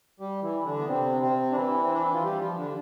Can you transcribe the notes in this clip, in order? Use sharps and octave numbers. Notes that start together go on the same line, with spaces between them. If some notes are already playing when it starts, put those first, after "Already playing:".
G3 G4
E3 E4
D3 D4
B3
C3 C4
C3 C4
D4
E3 E4
C4
D4
E4
F4
G3 G4
F3 F4
D3 D4